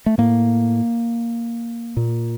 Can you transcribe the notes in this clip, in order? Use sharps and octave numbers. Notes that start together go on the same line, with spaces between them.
A3
A2 A#3
A#2